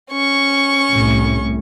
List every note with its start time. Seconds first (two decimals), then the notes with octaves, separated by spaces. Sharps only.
0.12 C#4 C#6
0.91 C2 A2